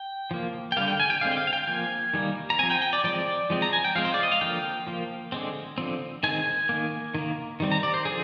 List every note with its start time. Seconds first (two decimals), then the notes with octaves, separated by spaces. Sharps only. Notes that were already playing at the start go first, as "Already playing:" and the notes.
Already playing: G5
0.31 F3 A#3
0.72 G5
0.77 D3 G3 A#3 F5
0.88 G5
1.00 G#5
1.10 G5
1.21 D3 G#3 C4 F5
1.31 G5
1.37 F5
1.47 F5
1.53 G5
1.67 F3 A#3 G#5
2.14 D#3 G3 A#3
2.50 A#5
2.59 C4 G#5
2.63 F3
2.70 G5
2.82 G5
2.93 D5
3.04 F3 G#3 C4 D5
3.50 F3 G#3 C4
3.62 A#5
3.73 G#5
3.85 G5
3.95 F3 G#3 C4 F5
4.05 C5
4.14 D5
4.23 D#5
4.32 F5
4.41 D3 F3 A#3 G5
4.87 F3 A#3
5.32 D3 G#3 C4
5.78 D3 F3 C4
6.23 D#3 G#3 C4 G#5
6.69 D#3 A#3
7.15 D#3 A#3
7.60 D#3 G3 C4
7.72 A#5
7.83 D5
7.94 C5
8.05 D3 F3 G#4